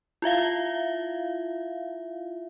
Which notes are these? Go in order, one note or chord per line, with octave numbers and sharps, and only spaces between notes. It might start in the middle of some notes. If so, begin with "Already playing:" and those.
E4 F4 E5 F5